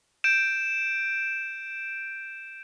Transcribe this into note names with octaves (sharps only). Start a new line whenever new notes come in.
G6 D7 E7